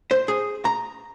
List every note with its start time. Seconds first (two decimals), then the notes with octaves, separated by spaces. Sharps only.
0.11 C5
0.28 G#4
0.65 A#5